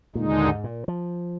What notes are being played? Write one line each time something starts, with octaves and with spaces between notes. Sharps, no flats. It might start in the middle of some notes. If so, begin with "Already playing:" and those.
D#2 A#2 D3 G#3 D#4
A#2
G#2
A#2
F3